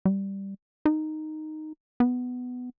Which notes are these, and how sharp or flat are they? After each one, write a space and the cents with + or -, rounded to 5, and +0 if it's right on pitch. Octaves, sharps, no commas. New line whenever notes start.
G3 +0
D#4 -5
B3 +10